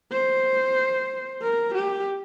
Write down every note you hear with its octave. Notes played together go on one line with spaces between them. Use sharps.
C5
A#4
G4